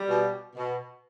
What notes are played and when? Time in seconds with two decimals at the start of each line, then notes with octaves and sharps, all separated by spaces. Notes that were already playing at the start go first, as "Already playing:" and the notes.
Already playing: G3
0.09 B2
0.56 B2